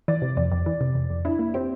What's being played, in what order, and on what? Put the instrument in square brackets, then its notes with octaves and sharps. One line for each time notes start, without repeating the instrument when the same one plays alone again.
[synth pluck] E3 [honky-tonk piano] D5
[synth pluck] C3
[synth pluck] F2 [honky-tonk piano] D5
[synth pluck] F2
E3
C3
F2
F2
[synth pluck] D4 [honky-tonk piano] E4
[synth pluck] A#3
[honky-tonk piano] C4 [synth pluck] G4